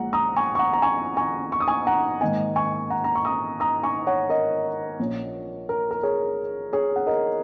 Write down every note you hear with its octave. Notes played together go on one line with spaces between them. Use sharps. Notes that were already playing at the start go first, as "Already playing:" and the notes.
Already playing: A#1 A#2 G#3 C#4 F#5 A#5
A#5 D#6
G#5 C#6
C#6
F#5 A#5
A#5
G#5 C#6
G#5 C#6
C#6
D#6
G#5 C#6
F#5 A#5
G#2 D#3 A#3 D#5 G#5
G#5 C#6
F#5 A#5
A#5
C#6
A#5 D#6
A#5 D#6
G#5 C#6
C#5 F#5
A#4 D#5
A#1 A#2 A#3 C#4
A#4
A#4
G#4 C#5
G#4 C#5
F#5
A#4 D#5